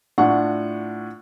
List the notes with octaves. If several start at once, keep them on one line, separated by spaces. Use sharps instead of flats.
A2 D4 F4 F#5 C#6